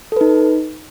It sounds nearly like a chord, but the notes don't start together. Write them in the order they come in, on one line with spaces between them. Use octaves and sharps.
A4 B4 D#4